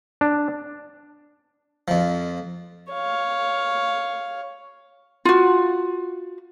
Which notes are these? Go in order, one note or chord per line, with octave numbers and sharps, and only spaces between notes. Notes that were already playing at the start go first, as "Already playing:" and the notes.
D4
F2 F3
C#5 F5
F4 F#4